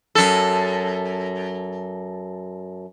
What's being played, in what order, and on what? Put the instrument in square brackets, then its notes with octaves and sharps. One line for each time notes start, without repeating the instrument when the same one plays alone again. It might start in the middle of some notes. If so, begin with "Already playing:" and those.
[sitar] F#2 A4